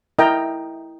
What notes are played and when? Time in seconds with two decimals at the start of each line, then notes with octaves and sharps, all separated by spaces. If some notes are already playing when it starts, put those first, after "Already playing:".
0.19 E4 A#4 D#5 G5 A#5